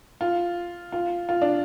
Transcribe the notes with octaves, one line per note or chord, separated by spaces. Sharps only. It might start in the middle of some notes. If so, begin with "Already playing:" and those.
F4
F4
F4
D4